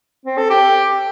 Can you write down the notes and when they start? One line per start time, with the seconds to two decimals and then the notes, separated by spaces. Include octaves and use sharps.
0.26 C4
0.38 A4
0.50 G4